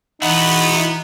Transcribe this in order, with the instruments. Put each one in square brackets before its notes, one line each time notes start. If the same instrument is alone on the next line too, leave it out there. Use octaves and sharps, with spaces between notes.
[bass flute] E3 [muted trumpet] B3 [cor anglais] D#4 [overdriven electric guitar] E4 F#4